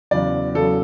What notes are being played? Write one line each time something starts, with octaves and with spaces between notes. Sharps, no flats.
E2 C#3 F#3 D5
E2 C#3 F#3 A4